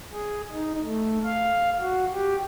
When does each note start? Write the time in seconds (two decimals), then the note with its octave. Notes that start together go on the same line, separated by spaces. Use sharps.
0.12 G#4
0.51 D#4
0.83 A3
1.25 F5
1.79 F#4
2.12 G4